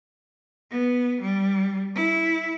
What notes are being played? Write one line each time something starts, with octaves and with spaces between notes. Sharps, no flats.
B3
G3
E4